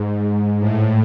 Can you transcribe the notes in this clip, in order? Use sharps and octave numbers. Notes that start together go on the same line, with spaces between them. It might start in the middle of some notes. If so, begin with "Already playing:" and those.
Already playing: G#2
A2